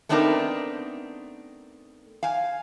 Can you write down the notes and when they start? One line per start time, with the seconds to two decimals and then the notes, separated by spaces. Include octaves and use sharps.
0.09 A3 B3 C4 D4 D#4 A#4
2.23 F5 G#5